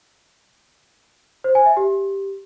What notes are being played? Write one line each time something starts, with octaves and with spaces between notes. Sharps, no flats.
C5
G#5
E5
G4